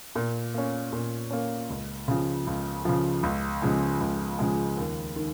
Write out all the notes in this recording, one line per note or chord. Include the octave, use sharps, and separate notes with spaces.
A#2
A#3 C#4
A#2
A#3 C#4
C#2
C#3 F3
C#2
C#3 F3
C#2
C#3 F3 G#3
C#2
C#3 F3 G#3
D#2
D#3